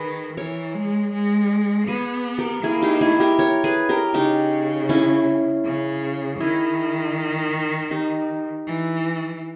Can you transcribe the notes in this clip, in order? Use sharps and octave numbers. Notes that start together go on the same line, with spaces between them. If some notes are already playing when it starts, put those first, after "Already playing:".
Already playing: D#3 G#4 B4
E3 A#4 C#5
G#3
G#3
B3 G#4 B4
G4 A#4
A#3 E4 G#4
D#4 G4
E4 G#4
G4 A#4
A#4 C#5
G#4 B4
G4 A#4
C#3 D#4 G4
C#4 E4
C#3
D#3 E4 G#4
D#4 G4
E3